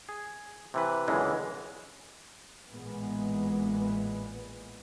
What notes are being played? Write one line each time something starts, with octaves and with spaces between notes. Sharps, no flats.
G#4
C3 E3 B4
C#2 F#2 B2 D3 E3 G#3
A1 A#2 E3 G#3 B3